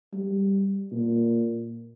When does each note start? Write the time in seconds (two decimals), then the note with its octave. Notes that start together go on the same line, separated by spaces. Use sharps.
0.13 G3
0.92 A#2